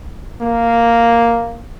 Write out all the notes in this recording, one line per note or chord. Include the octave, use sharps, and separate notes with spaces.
A#3